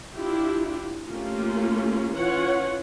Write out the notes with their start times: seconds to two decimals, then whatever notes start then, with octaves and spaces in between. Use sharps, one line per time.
0.14 D4 E4 F4 G4
1.08 A3 A#3 C#4 F4 G4
2.17 E3 C#4 F4 C#5 F#5